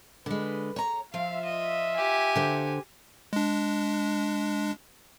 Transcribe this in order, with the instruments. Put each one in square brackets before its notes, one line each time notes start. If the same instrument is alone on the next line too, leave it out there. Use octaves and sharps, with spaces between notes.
[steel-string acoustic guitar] D3 G#3 [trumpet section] B4
[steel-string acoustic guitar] C#5 A#5
[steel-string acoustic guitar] F3 [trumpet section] F4 E5 [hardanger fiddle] F5
[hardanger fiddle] D#5
G4 G#5
[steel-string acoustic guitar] D3 C5
[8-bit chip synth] G#3 D4